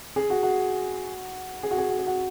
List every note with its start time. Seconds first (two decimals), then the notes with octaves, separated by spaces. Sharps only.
0.16 G#4
0.30 F#4
0.43 F#4
1.63 G#4
1.71 F#4
1.78 G#4
1.89 F#4
1.98 G#4
2.07 F#4